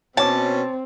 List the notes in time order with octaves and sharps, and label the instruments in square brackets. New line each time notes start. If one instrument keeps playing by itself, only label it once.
[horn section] B2 C#4 [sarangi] C4 [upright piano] C#5 D6 [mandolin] A5